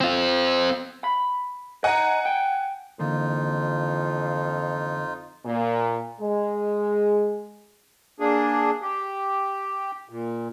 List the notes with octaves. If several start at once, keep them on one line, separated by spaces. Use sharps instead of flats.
C4 F4
B5
D#5 F#5 G#5 A#5
G5
F2 D3 E3 A#3 D#4 F4
A#2
G#3
A#3 D4 G#4
G4
A#2